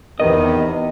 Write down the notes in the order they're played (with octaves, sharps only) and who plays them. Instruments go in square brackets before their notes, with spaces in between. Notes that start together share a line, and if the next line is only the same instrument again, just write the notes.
[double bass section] E2 [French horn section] C3 B3 [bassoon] D#3 [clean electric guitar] D#5